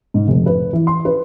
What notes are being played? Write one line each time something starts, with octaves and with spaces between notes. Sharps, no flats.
G#2
F1
B4
E3
C6
B4